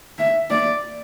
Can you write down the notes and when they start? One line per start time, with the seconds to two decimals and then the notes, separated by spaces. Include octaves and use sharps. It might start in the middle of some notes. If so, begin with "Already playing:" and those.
0.19 E5
0.50 D5